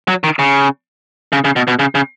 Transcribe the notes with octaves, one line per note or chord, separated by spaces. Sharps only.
F#3
D#3
C#3
C#3
C#3
B2
B2
C#3
C#3